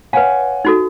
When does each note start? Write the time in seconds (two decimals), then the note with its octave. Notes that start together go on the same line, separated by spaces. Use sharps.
0.13 B4 C#5 F5 F#5 G#5
0.65 D#4 F#4 A4